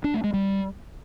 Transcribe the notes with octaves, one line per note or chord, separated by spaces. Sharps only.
D4
A3
G#3
G3